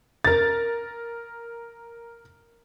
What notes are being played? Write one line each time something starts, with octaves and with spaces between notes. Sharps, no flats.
A#4 A6